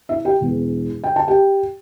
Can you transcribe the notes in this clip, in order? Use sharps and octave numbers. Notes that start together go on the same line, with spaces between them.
E4 E5
G4 G5
E1 E2 E3
G5
A5
G4 G5